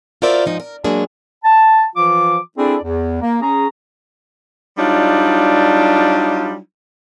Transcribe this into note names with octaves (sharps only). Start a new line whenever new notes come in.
F4 F#4 A#4 C5 D5 E5
G#2 F3 D#4
A#4
F#3 G#3 A#3 D4 G#4
A5
E3 F3 F4 D6
C4 D4 E4 G#4 A4 D5
E2
A#3
C#4 G#4 A#5
F#3 G3 D4 D#4 F4